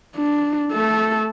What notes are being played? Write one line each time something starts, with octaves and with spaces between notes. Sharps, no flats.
D4
A3 A4